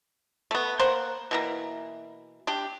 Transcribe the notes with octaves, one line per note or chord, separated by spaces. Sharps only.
A3 B3
A#3 C5 F#5
B2 E3 A#3
D4 G4